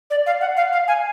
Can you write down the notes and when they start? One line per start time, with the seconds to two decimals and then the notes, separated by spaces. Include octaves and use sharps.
0.10 D5
0.26 F5
0.41 F#5
0.57 F5
0.73 F5
0.88 G#5